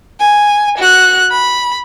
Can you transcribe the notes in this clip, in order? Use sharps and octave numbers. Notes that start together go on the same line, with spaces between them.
G#5
F#4 F#6
B5